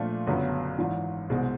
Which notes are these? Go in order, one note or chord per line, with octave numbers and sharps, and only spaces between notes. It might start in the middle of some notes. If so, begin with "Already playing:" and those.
Already playing: A#2 F3 A3 D4 F4
G1 F#2 C#3 F#3 B3
G#1 G#2 E3
C2 B2 G#3 C4